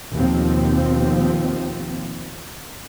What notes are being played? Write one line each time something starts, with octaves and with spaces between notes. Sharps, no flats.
D#2 B2 F3 C4